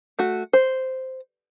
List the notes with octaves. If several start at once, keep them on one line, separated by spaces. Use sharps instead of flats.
A3 F#4
C5